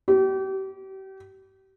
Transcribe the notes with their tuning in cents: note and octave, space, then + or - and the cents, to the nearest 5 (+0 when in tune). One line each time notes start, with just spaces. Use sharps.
G4 -35